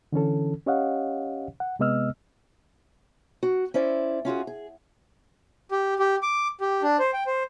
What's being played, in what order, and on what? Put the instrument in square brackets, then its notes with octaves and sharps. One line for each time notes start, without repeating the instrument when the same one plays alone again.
[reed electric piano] D3 E3 C#4 A4
C#4 G4 C#5 D#5 F5 F#5
F#5
C3 G#3 B3 D#5 E6 F6
[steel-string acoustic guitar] F#4
C#4 E4 C5 D5
C#4 F4 F#4 G#4
G#4
[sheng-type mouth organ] G4
G4
D6
G4
D4
C5
G5
C5